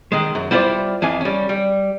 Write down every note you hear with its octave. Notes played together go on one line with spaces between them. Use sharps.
D#3 G#3
F#2
G3 E4 F4 B4 C5 D5
F2 E3 F5 G#5
G3 C#4
G3